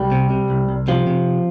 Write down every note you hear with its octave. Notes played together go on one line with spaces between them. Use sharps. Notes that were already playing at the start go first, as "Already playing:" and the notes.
Already playing: C2 G3
C3
C3
C2
C2
C3 F3
C3